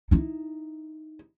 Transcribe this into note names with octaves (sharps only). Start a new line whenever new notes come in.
D#4 E4